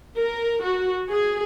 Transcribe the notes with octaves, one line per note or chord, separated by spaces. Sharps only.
A#4
F#4
G#4